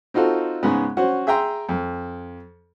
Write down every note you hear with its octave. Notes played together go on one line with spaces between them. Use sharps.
C4 D#4 F4 F#4 A4
G#2 C#3 G#3 B3
C#4 F#4 C5 F#5
G#4 E5 G5 A#5 C6
F2